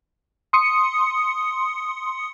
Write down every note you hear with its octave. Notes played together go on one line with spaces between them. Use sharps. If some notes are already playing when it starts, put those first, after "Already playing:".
C6 D#6 C#7